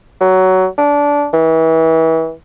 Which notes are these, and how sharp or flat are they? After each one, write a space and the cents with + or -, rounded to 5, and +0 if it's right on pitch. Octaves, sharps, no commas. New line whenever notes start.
F#3 +15
D4 -20
E3 -30